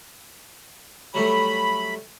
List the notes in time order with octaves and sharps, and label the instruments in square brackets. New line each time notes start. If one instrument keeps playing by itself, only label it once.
[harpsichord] F#3 G3 A3 [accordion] B5